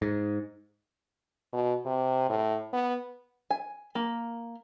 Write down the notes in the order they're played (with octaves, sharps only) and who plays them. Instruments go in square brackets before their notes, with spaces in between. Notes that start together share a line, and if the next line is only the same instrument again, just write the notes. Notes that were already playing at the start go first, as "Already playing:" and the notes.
[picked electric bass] G#2
[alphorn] B2
C3
A2
B3
[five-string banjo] G#5
A#3